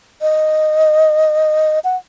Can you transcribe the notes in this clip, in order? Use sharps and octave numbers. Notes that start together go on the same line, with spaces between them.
D#5
F#5